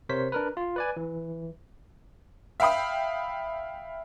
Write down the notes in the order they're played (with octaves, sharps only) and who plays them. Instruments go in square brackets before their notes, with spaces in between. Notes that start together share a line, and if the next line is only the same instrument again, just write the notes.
[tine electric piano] C3 A#4 C5 C#5 B6
D4 A#4 B4
F4
B4 D5 G#5
E3
[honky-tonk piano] E5 F5 G5 B5 D#6